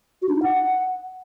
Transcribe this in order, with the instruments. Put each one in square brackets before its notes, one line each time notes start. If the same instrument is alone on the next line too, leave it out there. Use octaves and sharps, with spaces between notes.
[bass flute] F#4
D4
D#4
F#5